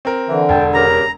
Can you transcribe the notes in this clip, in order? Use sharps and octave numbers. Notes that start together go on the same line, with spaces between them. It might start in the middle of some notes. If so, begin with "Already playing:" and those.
C4 A#4
D3 E3
E1 G5 A5
C#3 G4 A#4 A#5